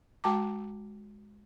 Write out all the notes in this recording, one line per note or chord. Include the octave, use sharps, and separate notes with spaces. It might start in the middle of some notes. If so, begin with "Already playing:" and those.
G#3 F#4 G5 A5 A#5 D6